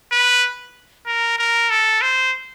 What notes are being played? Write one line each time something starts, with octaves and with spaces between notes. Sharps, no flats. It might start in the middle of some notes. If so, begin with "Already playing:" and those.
B4
A#4
A#4
A4
C5